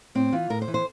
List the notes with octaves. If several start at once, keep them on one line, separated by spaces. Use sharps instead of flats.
A2 C4
E3 F4
A2 A#4
C5
E3
C5